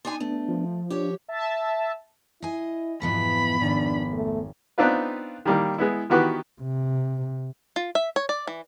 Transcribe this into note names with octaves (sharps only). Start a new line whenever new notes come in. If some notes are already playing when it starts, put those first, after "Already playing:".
D4 D#4 G#5 C6
A3 B3 D4
F3
D4 G4 C#5
E5 A5
E4 D#5 G#5 C7
F2 G#2 B2 E3 F3 B3 B5
G#1 D4 A6
A3
B3 C4 D4 D#4 F4 B4
D#3 G3 A#3
G#3 B3 E4
D#3 E3 B3 F#4 G4 B4
C3
F4
E5
C#5
D5
E3